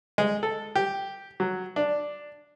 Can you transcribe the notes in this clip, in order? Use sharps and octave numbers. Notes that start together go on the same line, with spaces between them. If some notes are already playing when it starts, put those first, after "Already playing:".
G#3
A4
G4
F#3
D4